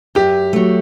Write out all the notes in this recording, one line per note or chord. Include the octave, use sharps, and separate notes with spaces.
F#2 G4
F#3 A3